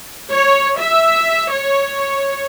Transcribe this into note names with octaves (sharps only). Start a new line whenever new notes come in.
C#5
E5
C#5